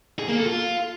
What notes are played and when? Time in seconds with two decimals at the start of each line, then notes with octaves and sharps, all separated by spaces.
0.19 G#4
0.28 A#3
0.37 A4
0.46 F4